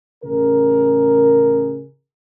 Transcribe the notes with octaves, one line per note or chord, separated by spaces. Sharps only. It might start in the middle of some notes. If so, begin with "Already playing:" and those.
A1 C#3 G#4 A#4